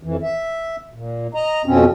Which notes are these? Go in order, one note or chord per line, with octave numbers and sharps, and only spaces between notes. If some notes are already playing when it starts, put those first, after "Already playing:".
F2 E3
E5
A#2
D#5 A#5
F2 B2 F3 C4 C#4